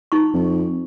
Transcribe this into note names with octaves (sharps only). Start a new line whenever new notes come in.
D#4 C#6
F2